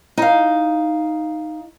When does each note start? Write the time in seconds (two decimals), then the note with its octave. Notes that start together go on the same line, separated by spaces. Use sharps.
0.18 D#4 F5